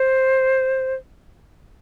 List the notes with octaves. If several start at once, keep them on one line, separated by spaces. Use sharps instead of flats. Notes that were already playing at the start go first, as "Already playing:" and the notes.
Already playing: C5